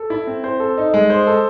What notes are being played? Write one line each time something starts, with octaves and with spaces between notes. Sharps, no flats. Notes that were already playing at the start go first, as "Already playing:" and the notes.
Already playing: A4
E4
C4
C5
A4
D#4
G#3
C5
A4